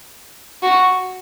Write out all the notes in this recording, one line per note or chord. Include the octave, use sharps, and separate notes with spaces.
F#4